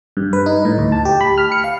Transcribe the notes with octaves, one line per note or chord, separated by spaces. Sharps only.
G2
B4
D#4
A2
D2
A5
G4
B5
F6
C#7
F5